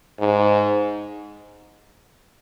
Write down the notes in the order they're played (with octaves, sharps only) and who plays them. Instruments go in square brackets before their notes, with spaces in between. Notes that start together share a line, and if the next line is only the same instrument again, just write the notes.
[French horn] G#2